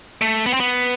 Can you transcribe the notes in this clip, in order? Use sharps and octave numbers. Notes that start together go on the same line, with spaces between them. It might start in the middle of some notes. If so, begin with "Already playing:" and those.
A3
B3
C4
B3